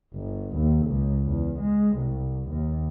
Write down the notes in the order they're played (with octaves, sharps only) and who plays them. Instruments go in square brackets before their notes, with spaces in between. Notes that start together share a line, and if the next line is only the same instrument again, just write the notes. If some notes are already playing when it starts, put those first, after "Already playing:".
[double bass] G1
D#2
C#2
E2
G#3
C2
D#2